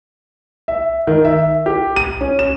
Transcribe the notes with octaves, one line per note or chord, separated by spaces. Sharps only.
E5
D#3
E5
G4
D#7
C#4
E7